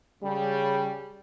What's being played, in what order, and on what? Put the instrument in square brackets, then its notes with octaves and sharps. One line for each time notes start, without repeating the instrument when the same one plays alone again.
[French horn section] C#3 G3